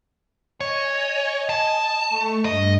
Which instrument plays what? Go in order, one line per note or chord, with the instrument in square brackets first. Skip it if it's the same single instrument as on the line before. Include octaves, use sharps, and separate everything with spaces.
[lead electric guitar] C#5 [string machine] D#5 G#5
[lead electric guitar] A5
[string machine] A3 C#6
[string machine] G2 [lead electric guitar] D#5